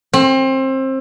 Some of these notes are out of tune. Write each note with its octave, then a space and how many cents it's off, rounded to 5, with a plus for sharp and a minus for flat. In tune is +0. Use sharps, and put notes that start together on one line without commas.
C4 +25